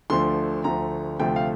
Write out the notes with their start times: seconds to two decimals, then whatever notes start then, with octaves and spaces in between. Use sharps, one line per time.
0.10 D2 D3 F3 A3 C6
0.64 D2 D3 F3 A3 A#5
1.19 D2 C3 F3 A3 G5
1.36 F5